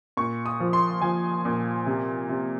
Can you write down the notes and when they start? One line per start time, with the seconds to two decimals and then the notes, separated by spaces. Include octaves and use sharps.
0.17 A#2 C#6
0.46 D#6
0.60 F3
0.73 C6
1.01 F3 G#5
1.45 A#2
1.86 C3
2.29 C3